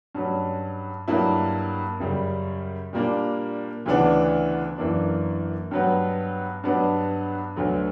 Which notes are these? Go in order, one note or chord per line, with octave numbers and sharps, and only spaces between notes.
G2 F#3 C#4
G2 F#3 A#3 E4
F#2 C#3 G3
A#2 G3 A#3 D4
D2 C#3 E3 B3 D4
F#2 E3 A#3 D4
G2 F#3 B3
G2 F#3 B3 D4
D2 D3 F#3 B3